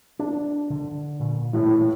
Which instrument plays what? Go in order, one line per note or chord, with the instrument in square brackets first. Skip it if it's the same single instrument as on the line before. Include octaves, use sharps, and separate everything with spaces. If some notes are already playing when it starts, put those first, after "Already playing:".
[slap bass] D4
D3
A#2
[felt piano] A2 E3